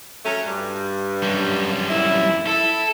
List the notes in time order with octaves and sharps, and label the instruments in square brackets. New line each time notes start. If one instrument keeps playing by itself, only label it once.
[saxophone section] F#3 A3 C#4
G2
[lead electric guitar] F#2 G3
[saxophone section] F2 A#2 E4
[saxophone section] E4 [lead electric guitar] A4